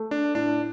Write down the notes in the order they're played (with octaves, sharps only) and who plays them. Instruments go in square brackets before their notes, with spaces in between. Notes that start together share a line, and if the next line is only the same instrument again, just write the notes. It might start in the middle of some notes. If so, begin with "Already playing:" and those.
Already playing: [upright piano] A3
[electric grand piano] D4
[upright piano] A2 [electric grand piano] D4